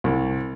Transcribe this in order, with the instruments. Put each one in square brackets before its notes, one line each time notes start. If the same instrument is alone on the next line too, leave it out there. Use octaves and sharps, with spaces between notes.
[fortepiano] C2